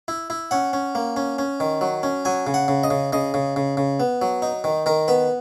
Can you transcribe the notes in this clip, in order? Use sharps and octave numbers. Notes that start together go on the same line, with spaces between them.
E4
E4
C#4 F#5
C#4
A#3
C#4
C#4
D#3
F#3
C#4
F#3 G#5
C#3
F#5
C#3
D#5
C#3
C#3 D#5
C#3
C#3
C#3
B3
F#3
D#4
D#3
D#3 A#4
B3 B4